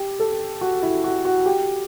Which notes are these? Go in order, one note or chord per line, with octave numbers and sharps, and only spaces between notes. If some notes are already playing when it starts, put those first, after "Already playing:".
Already playing: G4
A4
F#4
E4
F#4
F#4
G4